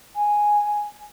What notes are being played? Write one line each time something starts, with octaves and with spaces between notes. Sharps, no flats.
G#5